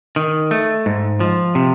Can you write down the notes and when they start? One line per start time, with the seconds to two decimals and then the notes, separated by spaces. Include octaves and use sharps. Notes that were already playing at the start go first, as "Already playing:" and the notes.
0.16 D#3
0.51 A3
0.86 G#2
1.20 F3
1.55 C3